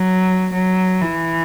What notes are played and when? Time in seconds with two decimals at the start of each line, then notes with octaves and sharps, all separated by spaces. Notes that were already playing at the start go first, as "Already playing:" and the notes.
Already playing: F#3
0.53 F#3
1.01 E3